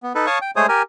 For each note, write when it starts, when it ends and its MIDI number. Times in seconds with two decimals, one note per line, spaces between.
0.03 0.13 59
0.15 0.26 63
0.15 0.26 69
0.15 0.26 71
0.27 0.39 73
0.27 0.39 77
0.27 0.39 81
0.27 0.39 85
0.27 0.39 87
0.42 0.51 79
0.56 0.66 56
0.56 0.66 57
0.56 0.66 68
0.56 0.66 72
0.56 0.66 73
0.56 0.66 87
0.69 0.82 67
0.69 0.82 70
0.69 0.82 80